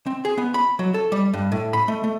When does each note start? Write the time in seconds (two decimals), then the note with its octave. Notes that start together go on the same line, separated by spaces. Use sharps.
0.06 C4
0.25 G#4
0.38 B3
0.54 B5
0.79 F#3
0.94 A4
1.12 G3
1.33 G2
1.52 A2
1.73 B5
1.88 A3
2.04 A3